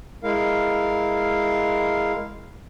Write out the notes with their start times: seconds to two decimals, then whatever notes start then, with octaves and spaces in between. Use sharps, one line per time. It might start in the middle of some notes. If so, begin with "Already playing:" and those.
0.23 G#3 E4 A#4 F5